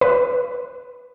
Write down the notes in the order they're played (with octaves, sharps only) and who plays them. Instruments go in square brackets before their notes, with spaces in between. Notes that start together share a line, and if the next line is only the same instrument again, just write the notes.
[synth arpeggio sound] B4